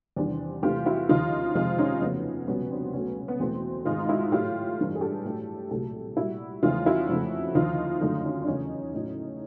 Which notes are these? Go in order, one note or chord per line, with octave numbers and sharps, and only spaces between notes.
E2 C3 D#3 G3 C4 D4
E2 C3 E3 A3 F4 G4
E4 F#4
D#2 C#3 F3 D#4 F4
F2 C3 F3 G#3 D#4 F4
C#4 D#4
F2 C#3 F#3 A3 B3 C#4
C2 B2 G3 B3 C#4
C4 D4
C#2 C#3 F#3 A3 B3 C#4
B3
E2 B2 F#3 A3 C4
G#2 D#3 G#3 D#4 F4
E4 F#4
A2 F#3 A3 F4 G4
G2 E3 A3
G#4
G4 A4
A2 F#3 A3
C2 A#2 F#3 A3 G4 A4
A#2 G3 E4 F#4
E2 C#3 F3 A3 D#4 F4
E4 F#4
F2 C#3 F3 A3
D#2 D3 F3 D#4 F4
F#2 D3 F3 A3 D#4 F4
C#4 D#4
D4
E2 C#3 F#3 A3 C#4 D#4
A2 F#3 A3